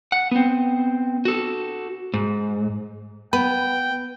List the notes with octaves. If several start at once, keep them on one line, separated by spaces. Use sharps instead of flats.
F#5
B3 C4
F#4 A4
G#2
B3 B4 G5